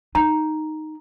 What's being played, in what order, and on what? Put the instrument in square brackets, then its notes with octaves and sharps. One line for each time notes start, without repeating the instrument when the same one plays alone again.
[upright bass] D#4 [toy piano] A#5